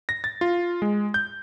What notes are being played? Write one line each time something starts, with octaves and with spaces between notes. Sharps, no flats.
A#6
A6
F4
G#3
G6